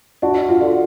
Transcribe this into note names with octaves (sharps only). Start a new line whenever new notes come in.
D4 F#4
F4
D3